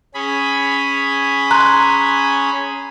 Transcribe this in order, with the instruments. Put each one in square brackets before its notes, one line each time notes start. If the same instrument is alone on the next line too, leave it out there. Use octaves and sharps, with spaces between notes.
[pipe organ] C#4 G#4 B5
[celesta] A#5 C6 F#6